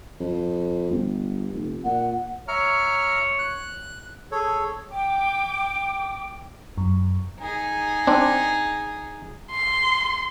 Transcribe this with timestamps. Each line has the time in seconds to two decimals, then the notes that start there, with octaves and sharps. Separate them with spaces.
0.20 F2
0.90 G1
1.54 F1
1.85 A#2 F#5
2.48 C#5 E5 A#5 F6
3.39 F#6
4.32 G#4 A4 C#5
4.89 G5 D6
6.78 F#2
7.40 D#4 G#4
8.07 C4 D4
9.51 C6